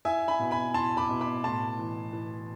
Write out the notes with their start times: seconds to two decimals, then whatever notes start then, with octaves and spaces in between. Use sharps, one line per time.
0.05 E4 E5 G#5
0.28 G#5 B5
0.40 B2
0.51 G#5 B5
0.74 E4 A5 C6
0.97 B5 D6
1.09 B2
1.21 B5 D6
1.44 A2 A5 C6
1.79 E3
2.13 E3